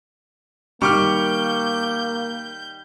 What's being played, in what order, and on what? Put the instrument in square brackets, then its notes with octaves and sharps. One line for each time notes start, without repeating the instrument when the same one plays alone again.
[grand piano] D#3 G3 [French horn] A#3 [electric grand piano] C#6 D6 F6 [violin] G6